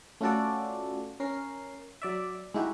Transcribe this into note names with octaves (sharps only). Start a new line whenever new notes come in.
A3 C#4 F4 F#4 A4 D5
C#4 A#4 C7
F#3 D5 E5
G#3 D#4 E4 F#4 G4